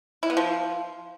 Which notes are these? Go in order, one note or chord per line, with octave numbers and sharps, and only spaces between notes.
E4
B3
F3